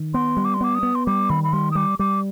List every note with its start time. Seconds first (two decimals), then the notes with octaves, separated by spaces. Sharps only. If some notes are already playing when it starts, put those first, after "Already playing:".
Already playing: D#3
0.14 B3 C6
0.37 G3
0.45 D6
0.54 C6
0.61 B3 D6
0.75 D#6
0.83 B3
0.95 C6
1.06 G3 D6
1.30 D#3 B5
1.44 B5
1.53 G3 C6
1.71 D#6
1.75 G3 D6
1.99 G3 D6